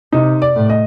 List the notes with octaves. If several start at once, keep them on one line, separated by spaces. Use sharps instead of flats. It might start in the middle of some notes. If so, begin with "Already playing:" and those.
C3 D#4
D5
A2
D#5